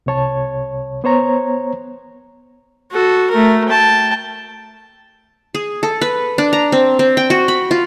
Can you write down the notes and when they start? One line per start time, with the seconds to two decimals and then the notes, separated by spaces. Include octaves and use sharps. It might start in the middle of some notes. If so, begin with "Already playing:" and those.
0.06 C2 C3 C#5 A5
1.04 B3 C5 C#5 A#5
2.92 F#4 A4
3.31 A3 A#4
3.69 G5 A5
5.55 G#4
5.83 A4
6.01 B4
6.38 D4
6.53 A#5
6.72 C4
6.99 C4
7.17 G5
7.30 F#4
7.48 B5
7.71 F4